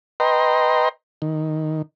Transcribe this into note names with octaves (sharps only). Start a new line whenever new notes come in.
B4 D#5 G5 A#5 C6
D#3